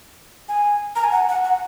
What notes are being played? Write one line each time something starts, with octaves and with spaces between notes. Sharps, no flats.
G#5
A#5
G#5
F#5
F#5
F#5